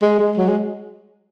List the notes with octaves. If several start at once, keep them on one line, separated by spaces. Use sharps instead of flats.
G#3
G#3
F#3
G#3